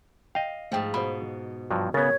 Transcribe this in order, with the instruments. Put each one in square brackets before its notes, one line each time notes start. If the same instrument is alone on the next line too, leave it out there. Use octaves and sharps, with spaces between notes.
[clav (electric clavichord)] D#5 F5 [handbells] G5
[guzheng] G#2 F3 [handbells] A3 G5
[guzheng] B2 [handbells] C5 B5
[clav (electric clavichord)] G2 F3 F#3
[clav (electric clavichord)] C#3 B3 [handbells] A#4 A6 A#6 [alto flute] C#5